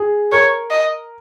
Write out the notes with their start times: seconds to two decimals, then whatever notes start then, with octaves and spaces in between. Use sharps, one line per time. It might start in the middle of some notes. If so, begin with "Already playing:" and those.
Already playing: G#4
0.32 A#4 C#5
0.71 D#5